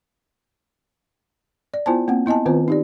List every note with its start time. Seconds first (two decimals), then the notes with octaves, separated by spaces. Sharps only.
1.74 D5
1.86 B3 E4 F4 C5 G#5 A5
2.08 A#3 C4 F#5
2.26 B3 E4 D#5 G#5 A5
2.46 D#3 B3 C4 F4 B4 C5
2.68 D#4 G4 D5